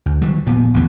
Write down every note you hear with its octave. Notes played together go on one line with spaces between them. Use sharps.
D2
D#3 F#3 G3
F1 A#2 B3
A1 E2 D3 B3